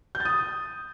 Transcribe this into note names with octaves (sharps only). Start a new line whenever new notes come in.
G6
A6
D#6